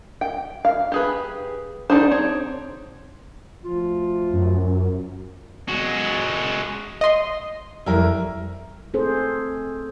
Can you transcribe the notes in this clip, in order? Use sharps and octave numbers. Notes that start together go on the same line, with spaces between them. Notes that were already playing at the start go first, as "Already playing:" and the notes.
G5
F5
G4 G#4 B4
D4 D#4 G4 G#4 C5
C4 C#5
D2 F3 F4
F#2
G#3 F#4
D#5 C6
F2 G3 E4 A#4
C4 G#4 A4 C5